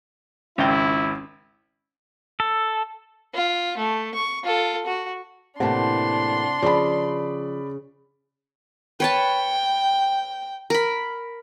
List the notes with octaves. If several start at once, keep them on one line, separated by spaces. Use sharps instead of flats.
G#1 C#2 C#4 E4 G5
A4
F4
A3
C#6
F4 A4
F#4
A2 C3 E3 A#3 D4 F#5 A5 C6
C#3 F3 D5 B5
B4 C#5 G5 A5
A#4 B5